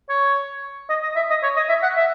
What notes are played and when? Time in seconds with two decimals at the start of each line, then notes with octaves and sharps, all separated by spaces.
0.09 C#5
0.90 D#5
1.03 D#5
1.16 E5
1.30 D#5
1.43 C#5
1.56 D#5
1.69 E5
1.83 F#5
1.97 E5